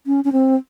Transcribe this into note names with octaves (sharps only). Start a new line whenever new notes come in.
C#4
C#4
C4